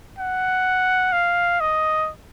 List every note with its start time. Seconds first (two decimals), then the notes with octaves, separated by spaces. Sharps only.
0.18 F#5
1.13 F5
1.60 D#5